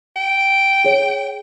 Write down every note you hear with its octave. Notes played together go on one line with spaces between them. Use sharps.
G5
G#4 C#5